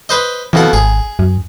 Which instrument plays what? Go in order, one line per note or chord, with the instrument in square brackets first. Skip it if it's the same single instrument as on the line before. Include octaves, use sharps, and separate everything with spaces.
[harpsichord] B4 C5 D#5
[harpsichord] F2 B2 F#5 [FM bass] E3
[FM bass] G#1 [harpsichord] G#4
[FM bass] F#2